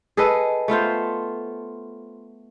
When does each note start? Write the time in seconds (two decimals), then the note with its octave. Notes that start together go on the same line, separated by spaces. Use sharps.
0.17 G#4 A4 B4 D#5
0.68 A3 B3 F4 C5